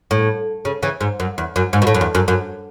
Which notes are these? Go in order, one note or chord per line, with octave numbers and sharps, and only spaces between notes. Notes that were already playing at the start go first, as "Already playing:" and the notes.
A2
C#3
C#3 E3
G#2
F#2
E2
F#2
G#2
B2
A2
F#2
E2
F#2
F#2